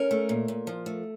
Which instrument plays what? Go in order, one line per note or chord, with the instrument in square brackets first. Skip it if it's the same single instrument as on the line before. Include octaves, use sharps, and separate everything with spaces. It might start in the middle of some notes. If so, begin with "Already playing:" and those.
Already playing: [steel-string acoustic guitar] C#4 A#4
A3
A#2
A#2
F3
A3